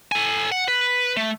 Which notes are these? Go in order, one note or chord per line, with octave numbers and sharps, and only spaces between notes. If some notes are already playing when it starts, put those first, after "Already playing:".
A4 G#5
F#5
B4
A3